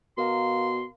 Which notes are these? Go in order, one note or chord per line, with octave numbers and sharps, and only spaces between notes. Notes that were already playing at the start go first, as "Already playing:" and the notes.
B2 A#4 F5 A#5 C6